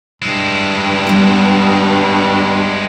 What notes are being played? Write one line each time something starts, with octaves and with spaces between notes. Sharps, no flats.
G2 G#3 E4
G3 B3